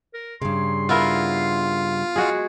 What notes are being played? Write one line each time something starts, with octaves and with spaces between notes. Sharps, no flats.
A#4
G2 C#3 C6
B3 E4 F4 A#4
G#3 F#4 G#4